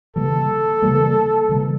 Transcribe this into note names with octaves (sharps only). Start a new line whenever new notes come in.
C#3 E3 G3 A#3 A4
C#3 E3 G3 A#3
C#3 E3 G3 A#3